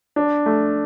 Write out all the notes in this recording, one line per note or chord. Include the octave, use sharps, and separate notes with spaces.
D4
A3